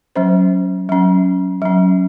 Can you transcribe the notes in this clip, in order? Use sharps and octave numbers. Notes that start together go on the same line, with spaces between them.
F#3 C#4 C5
F#3 C#4
F#3 C#4